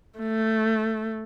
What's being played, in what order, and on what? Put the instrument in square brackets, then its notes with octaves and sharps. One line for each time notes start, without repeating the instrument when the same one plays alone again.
[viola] A3